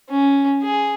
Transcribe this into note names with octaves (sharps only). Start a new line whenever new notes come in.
C#4
G#4